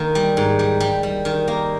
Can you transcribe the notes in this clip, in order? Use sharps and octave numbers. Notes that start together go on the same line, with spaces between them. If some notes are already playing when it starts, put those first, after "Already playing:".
Already playing: D#3 A#3
G3
G#2
G3
G3
G3
D#3
A#3